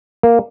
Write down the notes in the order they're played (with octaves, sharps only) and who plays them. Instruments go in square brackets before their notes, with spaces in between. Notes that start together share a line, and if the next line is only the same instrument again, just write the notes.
[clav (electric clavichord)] A#3